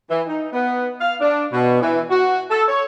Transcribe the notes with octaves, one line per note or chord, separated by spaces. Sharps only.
E3
D#4
B3
F5
D4
B2
E3
F#4
A4
C#5